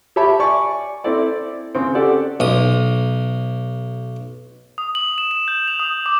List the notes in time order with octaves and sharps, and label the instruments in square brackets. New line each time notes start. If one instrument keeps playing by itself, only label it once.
[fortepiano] G4 C#5 E5 A5 B5
D5 G#5 C#6
C4 E4 A4 D5
C#3 C4
G4 A4 D5 F#5
[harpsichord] B1 D#6
[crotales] D#6
F#7
E7
E7
G6
F7
D#6
D6